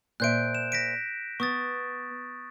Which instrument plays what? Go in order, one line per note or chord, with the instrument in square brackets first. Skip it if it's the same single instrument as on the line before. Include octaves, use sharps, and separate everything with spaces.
[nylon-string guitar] A#2 C5 E5 [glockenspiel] F#6 G6 D7
[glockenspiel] E7
A#6 B6 D7
[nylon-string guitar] B3 [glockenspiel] C#6 D#6 A6